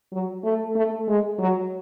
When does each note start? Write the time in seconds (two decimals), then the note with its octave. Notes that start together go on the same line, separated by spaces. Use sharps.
0.12 F#3
0.44 A3
0.75 A3
1.08 G#3
1.39 F#3